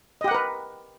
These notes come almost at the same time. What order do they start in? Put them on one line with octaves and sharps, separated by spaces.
D#5 G4 F#5 A#4 B4